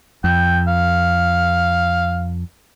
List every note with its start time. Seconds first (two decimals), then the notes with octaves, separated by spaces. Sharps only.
0.24 F2 G5
0.67 F5